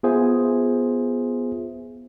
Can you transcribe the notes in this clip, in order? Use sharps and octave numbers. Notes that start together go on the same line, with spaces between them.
B3 F4 G#4 C5 E5